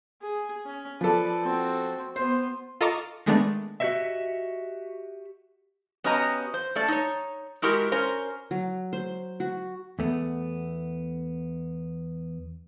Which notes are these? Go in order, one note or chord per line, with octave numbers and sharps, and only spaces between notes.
G#4
C#4
F3 A4 B4 D5
C4 F#4
B3 C5 C6
F4 A4 D#5 A#5 C#6 D6
D#3 G#3 A3 B3 D4
F#4 G4 C5 C#5 D#5 E5
B3 C#4 F#4 G4 D#5 A#5
C5
A3 C#4 A4 D5 A5
D#4 C#5
G#3 E4 F#4 G4 A#4
C#4 A#4 C5 C#5
F#3
C5
F#4
E2 A3 B3